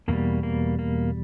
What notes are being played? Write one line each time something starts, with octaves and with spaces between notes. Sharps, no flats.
E2 B2 G3 A#3
A#3
A#3